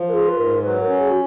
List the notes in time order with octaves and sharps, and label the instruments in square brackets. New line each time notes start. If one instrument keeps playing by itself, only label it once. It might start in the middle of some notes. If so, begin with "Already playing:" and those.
Already playing: [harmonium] F3
[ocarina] A#4
[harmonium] F4 [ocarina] G#4
[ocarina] B4
[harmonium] G#2 [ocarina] A#4
[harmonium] F#3 [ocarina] B4
[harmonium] C#4 [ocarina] A#4
[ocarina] G#4
F#4